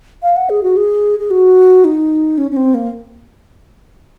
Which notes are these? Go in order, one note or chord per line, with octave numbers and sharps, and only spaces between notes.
F5
F#5
G#4
F#4
G#4
G#4
F#4
D#4
C#4
C#4
C4
A#3